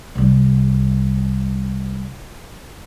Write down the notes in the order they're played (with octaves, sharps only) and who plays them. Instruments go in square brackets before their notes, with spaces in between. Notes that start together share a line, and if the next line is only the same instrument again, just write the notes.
[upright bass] C2 G3